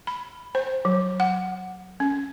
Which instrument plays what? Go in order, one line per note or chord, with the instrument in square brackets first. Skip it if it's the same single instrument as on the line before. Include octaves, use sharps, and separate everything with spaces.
[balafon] B5
C5
F#3
F#5
C#4